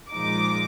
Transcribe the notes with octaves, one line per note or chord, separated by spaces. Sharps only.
A#2 F3 G#3 D#4 D6